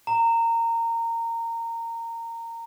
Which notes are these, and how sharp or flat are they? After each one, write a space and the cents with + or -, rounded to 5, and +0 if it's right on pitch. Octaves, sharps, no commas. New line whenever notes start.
A#5 -20